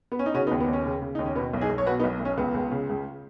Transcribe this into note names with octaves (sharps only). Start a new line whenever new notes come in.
B3
C#4
D#4
C#3 C#4 F#4
B3 D#4
D#2
B3
D#2
C#4
C#3
C#3
D#2 D#4
C#4
B2 B3
B1
D#4 G#4
B1
C#5
B2 F#4 B4
B3 D#4
B1
B1
C#4
C#2 B3
C#2
C#3
C#2